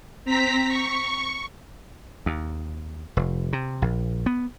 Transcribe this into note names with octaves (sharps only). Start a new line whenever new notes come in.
C4 A#5 B6
C#6
D#2
F1
C3
A#1
B3